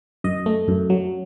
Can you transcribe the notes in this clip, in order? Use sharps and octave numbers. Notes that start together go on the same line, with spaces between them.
F#2 D#5
A3
F#2
F#3